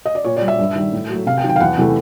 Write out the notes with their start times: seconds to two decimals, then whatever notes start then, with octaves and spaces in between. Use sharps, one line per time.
0.05 D#5
0.15 D5
0.25 A#2 C#5
0.36 D5
0.41 G3
0.48 E5
0.59 G2
0.75 D#3 G3
0.93 A2
1.09 F#3 A3
1.26 C3 F5
1.37 G5
1.43 D#3 F#3
1.49 G5
1.56 F5
1.60 E2 F#5
1.78 C3 E3 A3